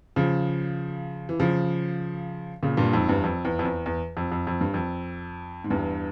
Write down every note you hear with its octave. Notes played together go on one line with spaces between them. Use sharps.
C#3 F3
E3
C#3 F3
A#2 C#3
G2 A#2
F2 G#2
E2 G2
F2
E2
F2
E2
E2
F2
F2
F2
G2
F2
G#2
E2 G2